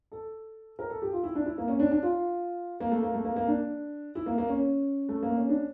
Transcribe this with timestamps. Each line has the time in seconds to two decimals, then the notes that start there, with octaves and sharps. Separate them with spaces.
0.12 A4
0.79 A#4
0.90 A4
1.02 G4
1.12 F4
1.23 E4
1.35 D4
1.46 E4
1.58 A#3
1.68 C#4
1.80 D4
1.91 D4
2.03 F4
2.80 A#3
2.91 A3
3.03 A#3
3.14 A3
3.25 A#3
3.36 A#3
3.47 D4
4.15 E4
4.26 A#3
4.38 A#3
4.48 C#4
5.09 A3
5.23 A#3
5.36 C#4
5.49 D4